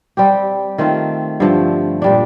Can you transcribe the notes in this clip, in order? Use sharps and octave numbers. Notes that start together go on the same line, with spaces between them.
G3 C4 G4
D#3 A3 C4 F4
G2 D3 F3 A3
A#2 G3 D4